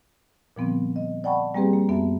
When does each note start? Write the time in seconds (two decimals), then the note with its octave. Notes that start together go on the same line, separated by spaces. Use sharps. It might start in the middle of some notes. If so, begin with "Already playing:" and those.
0.56 A#2 D3 F3 G3 B3 C4
0.96 D#5
1.24 D5 F#5 G5 A5 B5 C#6
1.55 G3 A#3 C4 G4 G#4 B4
1.73 A#3
1.89 F#2 B3 E5 A5